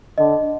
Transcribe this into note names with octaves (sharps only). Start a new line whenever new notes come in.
D3 D#5